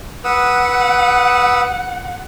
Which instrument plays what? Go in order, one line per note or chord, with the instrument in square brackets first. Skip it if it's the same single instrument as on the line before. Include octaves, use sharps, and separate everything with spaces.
[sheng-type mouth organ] B4 D#6 E6 [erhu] F#5